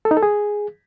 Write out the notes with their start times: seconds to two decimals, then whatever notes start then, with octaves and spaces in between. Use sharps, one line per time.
0.05 A4
0.11 D#4
0.17 A4
0.23 G#4